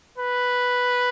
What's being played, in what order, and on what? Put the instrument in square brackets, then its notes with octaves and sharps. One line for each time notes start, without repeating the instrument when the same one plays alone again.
[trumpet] B4